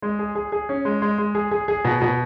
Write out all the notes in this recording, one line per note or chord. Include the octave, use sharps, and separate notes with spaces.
G#3
G#4
G#4
G#4
C#4
G#3
G#3
G#3
G#4
G#4
G#4
B2
B2